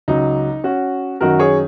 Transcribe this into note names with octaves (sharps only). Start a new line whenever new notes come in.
C#2 C#3 F#3 D#4
C#4 F#4
F#2 D#3 F#3 F#4 A#4
G#4 C#5